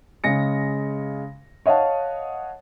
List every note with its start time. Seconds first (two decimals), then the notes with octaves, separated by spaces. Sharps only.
0.24 C#3 G#3 A#6 C#7
1.66 C#5 D#5 F5 F#5 A5